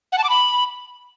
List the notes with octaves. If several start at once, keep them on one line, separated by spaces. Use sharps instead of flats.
F#5
A5
D6
B5